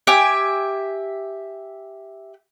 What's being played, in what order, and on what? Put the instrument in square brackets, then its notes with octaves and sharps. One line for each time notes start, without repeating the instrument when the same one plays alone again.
[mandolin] G4 E5 G5 G#5